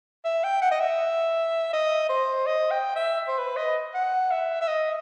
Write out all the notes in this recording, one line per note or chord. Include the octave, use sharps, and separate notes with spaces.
E5
G5
F#5
D#5
E5
D#5
C5
D#5
G5
E5
C5
B4
D#5
F#5
E5
E5
D#5